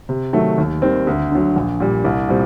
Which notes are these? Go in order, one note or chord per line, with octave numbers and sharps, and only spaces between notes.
C3
D#3 F#3 A3
D#2
D#3 G3 C4
D2
D3 F#3
A#1
A#2 G3
C2
A#2 G3 C4